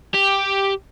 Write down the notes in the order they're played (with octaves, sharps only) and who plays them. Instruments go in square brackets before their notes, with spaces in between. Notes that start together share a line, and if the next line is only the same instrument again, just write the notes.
[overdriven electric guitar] G4